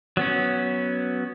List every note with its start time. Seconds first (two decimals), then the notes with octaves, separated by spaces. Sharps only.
0.17 F#3 B3 C#4